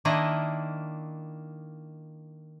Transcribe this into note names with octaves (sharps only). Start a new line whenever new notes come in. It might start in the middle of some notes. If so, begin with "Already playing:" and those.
D#3 A#3 D4 E4 D#5